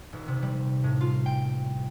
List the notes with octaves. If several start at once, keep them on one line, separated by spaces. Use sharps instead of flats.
D#1
C3
G3
A2
F4
G5